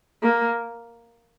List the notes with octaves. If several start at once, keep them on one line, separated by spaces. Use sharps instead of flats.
A#3